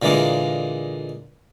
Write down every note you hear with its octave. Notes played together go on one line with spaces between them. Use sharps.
A#2 D3 E3 G#3 A#3